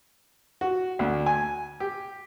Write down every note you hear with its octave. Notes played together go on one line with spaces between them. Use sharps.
F#4
D2
G#5
G4